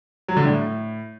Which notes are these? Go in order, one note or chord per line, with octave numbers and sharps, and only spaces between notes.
F#3
D3
A2